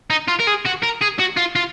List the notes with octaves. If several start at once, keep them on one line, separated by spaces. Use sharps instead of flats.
D#4
F4
A#4
G#4
F#4
A#4
G#4
F#4
F4
F4